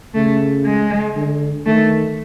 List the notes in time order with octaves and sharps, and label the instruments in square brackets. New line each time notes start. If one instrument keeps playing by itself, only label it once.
[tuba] C#3 [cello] A3
[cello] G#3
[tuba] D3
[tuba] D#3 [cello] A3